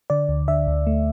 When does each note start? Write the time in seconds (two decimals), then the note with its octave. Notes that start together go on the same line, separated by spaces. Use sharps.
0.10 D3 D5
0.29 D2
0.48 D3 E5
0.67 D2
0.87 A3